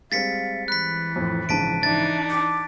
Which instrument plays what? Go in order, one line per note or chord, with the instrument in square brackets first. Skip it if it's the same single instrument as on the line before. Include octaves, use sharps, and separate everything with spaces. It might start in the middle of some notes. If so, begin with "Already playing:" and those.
[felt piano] G3 G#3 C4 [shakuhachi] F5 [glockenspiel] A6 B6 C#7
[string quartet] E3 [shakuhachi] B5 [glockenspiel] F#6 B6
[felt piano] F2 A2
[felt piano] A#1 G#2 C#3 [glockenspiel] A5 B6 D7
[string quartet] E3 D4 D#4 [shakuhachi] E5 [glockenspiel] A6
[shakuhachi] D6 [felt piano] C#7